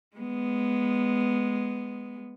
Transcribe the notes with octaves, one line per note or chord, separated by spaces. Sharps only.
G#3 B3